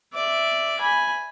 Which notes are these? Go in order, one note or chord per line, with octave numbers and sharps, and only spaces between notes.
D5 E5
G#5 B5